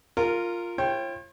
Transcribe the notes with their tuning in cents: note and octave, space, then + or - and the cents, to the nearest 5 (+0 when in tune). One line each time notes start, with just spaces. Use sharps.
F4 +0 A#4 -15
F4 -35 C#5 -45 G5 +0